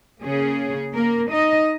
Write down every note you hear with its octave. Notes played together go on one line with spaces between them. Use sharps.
C#3 A#3 C#4 G#4
A#3 A#4
D#4 D#5